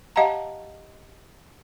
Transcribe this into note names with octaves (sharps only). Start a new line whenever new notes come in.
G4 D#5 F5 F#5 A5 A#5